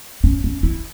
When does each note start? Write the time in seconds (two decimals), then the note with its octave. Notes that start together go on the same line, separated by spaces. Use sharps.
0.24 C#4
0.44 C#4
0.63 E4